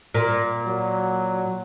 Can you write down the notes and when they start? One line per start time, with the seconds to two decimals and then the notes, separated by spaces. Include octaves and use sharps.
0.15 A#2
0.65 F#3